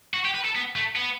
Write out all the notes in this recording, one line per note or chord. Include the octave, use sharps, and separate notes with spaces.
F#4
G4
B4
A4
B3
A3
B3